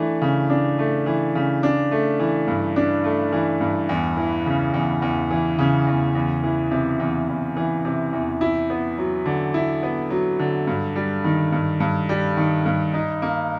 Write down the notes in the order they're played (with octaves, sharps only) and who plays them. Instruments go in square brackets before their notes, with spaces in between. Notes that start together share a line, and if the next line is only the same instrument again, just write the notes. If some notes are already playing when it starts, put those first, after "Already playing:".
Already playing: [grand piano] E3 A3 D4
C#3
D4
A3
E3
C#3
D4
A3
E3
G2
D4
A3
E3
G2
E2
E3
C#3
E2
E2
E3
C#3
E2
E2
E3
C3
E2
E2
E3
C3
E2
E4
B3
F#3
D3
E4
B3
F#3
D3
G2
G3
D#3
G2
G2
G3
D#3
G2
D#4
A#3